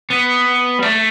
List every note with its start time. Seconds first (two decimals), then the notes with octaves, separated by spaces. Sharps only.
0.10 B3
0.79 G3
0.82 A3